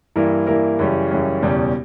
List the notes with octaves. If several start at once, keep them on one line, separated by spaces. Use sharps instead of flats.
G2 E3 A#3 E4 A#4
G2 E3 A#3 E4 A#4
F#2 C#3 E3 G3 C#4
F#2 C#3 E3 G3 C#4
F#1 E2 B2 G3 C#4